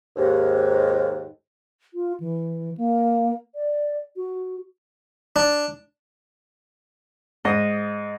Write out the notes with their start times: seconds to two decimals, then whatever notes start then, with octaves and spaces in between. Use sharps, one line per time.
0.16 D#2 G#2
1.94 F4
2.20 E3
2.77 A#3
3.55 D5
4.16 F#4
5.36 D4
7.45 G#2 D#5